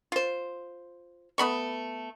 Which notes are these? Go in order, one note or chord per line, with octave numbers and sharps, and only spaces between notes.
F4 C5
A3 B3 B5 C#6